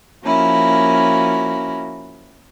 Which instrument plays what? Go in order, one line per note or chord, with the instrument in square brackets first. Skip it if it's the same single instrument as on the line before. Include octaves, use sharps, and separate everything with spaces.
[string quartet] F3 A#3 C#4 E4 F#4